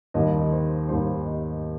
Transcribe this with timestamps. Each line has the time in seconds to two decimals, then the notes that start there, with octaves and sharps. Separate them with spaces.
0.14 D#2 D#3 G3 D#5
0.52 C5
0.89 D#2 D#3 G3 C5
1.26 D#5